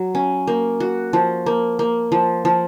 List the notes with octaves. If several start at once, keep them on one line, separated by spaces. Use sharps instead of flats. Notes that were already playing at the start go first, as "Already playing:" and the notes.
Already playing: F#3
C#4
A#3
F#4
F3
A#3
A#3
F3
F3